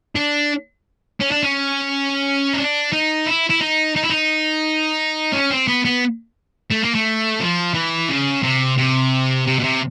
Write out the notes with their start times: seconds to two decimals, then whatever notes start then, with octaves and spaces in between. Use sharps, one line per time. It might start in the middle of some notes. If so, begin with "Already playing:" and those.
0.16 D4
1.20 C#4
1.31 D4
1.43 C#4
2.54 D#4
2.58 D4
2.93 D#4
3.27 E4
3.50 E4
3.61 D#4
3.96 D#4
4.03 E4
4.10 D#4
5.33 C#4
5.50 C4
5.68 B3
5.85 B3
6.71 A3
6.83 A#3
6.95 A3
7.41 F3
7.74 E3
8.09 C#3
8.43 C3
8.77 C3
9.47 C3
9.60 B2
9.64 C3